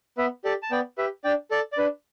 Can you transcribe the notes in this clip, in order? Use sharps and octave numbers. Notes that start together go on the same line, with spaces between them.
B3 B4 E5
G4 A4 D5
A5
B3 D5 G5
G4 B4 E5
D4 D5 G5
A4 D5
D5
D4 B4